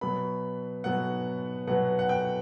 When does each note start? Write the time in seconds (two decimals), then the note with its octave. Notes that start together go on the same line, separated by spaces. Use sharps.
0.01 B2 F#3 B3 B5
0.84 B2 F#3 B3 F#5
1.67 B2 F#3 B3 F#5
1.99 F#5
2.09 G5